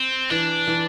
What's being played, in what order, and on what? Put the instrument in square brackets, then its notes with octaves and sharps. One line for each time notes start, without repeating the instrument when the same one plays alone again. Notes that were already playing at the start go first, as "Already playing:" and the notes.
Already playing: [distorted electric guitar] C4
[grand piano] E3 [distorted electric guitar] D4
[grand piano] E3